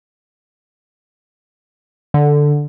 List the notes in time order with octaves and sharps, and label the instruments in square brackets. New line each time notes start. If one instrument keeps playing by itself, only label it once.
[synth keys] D3